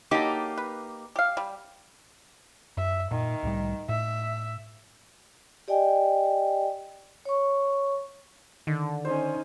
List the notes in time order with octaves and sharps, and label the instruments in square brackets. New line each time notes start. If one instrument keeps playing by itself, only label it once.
[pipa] F#3 A4 [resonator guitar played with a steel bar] A#3 D#4 G4
[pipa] B4
G4 F5
G3
[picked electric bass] F#2 [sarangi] E5
[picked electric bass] A#2 [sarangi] D#3
[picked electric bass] C2 A2 G3
[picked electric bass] A2 [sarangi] E5
[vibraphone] G4 D5 D#5 G5 G#5
C#5 C#6
[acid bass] D3 [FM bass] D#3
[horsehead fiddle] C#4 D#4 [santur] C5